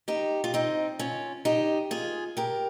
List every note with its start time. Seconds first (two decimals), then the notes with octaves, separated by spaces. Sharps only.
0.08 D#4 G4
0.44 F4
0.54 C4 D#4
0.99 C#4 F4
1.45 D#4 G4
1.91 F4 G#4
2.37 G4 A#4